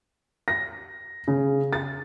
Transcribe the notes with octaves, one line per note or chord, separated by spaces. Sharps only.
A#6
C#3
A6